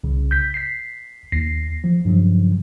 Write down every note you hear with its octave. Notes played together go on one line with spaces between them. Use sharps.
C2 C#3
G6 B6
B6 C7
D#2 A#6 C7
F3
G2 C#3 F3 F#3